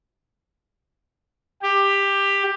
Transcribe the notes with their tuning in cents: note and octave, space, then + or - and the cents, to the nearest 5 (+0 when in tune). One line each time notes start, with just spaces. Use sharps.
G4 +15